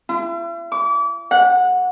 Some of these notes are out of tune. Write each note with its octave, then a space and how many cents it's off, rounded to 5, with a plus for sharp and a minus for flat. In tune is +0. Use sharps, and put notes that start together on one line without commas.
E4 +45
D6 -35
F#5 -20